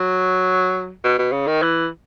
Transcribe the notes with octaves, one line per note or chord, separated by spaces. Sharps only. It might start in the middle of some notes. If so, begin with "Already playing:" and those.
Already playing: F#3
B2
B2
C#3
D#3
E3